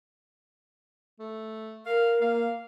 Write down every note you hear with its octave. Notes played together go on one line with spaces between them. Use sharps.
A3
A#4 F5
A#3 F5